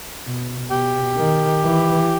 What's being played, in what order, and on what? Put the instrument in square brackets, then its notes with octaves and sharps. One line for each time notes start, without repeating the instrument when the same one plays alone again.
[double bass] B2
[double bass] B2 [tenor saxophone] G4
[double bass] D#3
E3